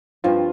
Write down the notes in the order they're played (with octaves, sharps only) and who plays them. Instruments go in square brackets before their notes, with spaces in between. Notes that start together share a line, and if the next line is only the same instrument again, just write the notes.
[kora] G2 F3 C4 [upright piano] F4